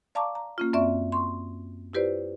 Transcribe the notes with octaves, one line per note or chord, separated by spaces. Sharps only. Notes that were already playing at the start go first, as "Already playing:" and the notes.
D5 F5 A5 A#5 C#6 D6
A#5
A#3 C#4 F4
F#2 C4 D5 E5 C#6
C6 C#6
E4 F4 G4 B4 C5 D5